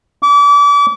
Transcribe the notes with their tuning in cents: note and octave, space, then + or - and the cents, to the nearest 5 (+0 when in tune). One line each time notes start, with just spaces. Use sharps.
D6 -35